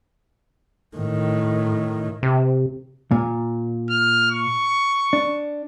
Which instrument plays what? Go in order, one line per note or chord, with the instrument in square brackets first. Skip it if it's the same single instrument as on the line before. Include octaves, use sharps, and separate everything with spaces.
[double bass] A2 D#3
[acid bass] C3
[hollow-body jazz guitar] A#2
[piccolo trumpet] F6
C#6
[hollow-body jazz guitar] D4